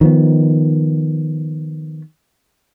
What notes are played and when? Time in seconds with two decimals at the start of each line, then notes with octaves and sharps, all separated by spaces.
0.01 D#3 F3 B3